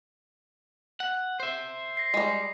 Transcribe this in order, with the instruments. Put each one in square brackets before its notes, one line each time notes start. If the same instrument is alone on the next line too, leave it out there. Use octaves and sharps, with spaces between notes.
[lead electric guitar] F#5
C5 E5
[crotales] A#6 C7
[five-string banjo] G3 G#3